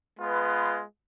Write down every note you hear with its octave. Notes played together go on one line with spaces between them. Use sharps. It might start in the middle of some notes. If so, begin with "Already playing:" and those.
G#3 B3 F4 B4